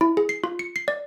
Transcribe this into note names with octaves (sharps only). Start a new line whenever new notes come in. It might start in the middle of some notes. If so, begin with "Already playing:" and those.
E4
G#4
C7
F4
C#7
C7
D5